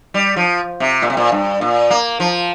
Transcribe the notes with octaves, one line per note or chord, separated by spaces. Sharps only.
G3
F3
C3
A#2
C3
A#2
G2
A#2
A#3
F3